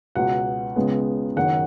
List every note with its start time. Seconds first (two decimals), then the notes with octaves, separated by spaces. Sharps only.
0.15 C#2 B2 B3 F#5
0.76 C#2 C#3 G#3 B3
1.36 F#1 F#2 D#3 F#5